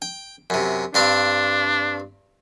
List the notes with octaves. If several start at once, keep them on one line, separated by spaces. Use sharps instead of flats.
G5
F#2 C3
G2 C4 D4 F5